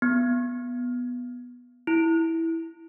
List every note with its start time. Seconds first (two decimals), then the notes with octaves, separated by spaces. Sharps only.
0.02 B3
1.87 E4